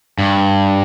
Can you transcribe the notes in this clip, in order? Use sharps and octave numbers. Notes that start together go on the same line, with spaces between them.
G2